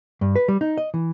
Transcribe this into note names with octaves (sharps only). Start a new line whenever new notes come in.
G2
B4
G3
D#4
D#5
E3